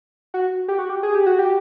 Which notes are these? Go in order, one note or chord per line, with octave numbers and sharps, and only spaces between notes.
F#4
G4
F#4
G4
G#4
G4
F#4
G4